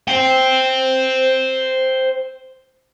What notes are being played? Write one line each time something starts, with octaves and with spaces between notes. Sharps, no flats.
C5 G5